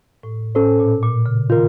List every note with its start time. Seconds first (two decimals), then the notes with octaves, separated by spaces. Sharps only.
0.23 A2
0.55 A2 C#4 A4 C5
0.80 A#2
1.03 A#2
1.26 C#3
1.50 D#3 F4 A#4